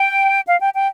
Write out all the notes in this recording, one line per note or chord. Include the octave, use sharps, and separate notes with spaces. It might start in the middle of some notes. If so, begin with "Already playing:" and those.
Already playing: G5
F5
G5
G5